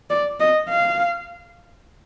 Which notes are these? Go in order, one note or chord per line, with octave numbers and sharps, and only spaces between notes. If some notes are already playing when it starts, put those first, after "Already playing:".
D5
D#5
F5